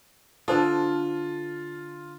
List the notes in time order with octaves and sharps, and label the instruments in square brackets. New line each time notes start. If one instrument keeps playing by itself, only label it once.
[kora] D3 D4 [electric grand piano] F4 [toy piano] A4 C5 A5